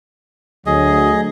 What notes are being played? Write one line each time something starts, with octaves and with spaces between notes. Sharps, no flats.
D2 F#3 G#4 D#5